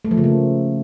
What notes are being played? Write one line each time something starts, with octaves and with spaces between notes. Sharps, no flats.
A3
F3
C#3
A#3